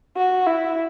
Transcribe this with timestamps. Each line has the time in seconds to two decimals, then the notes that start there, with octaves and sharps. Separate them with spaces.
0.17 F#4
0.46 E4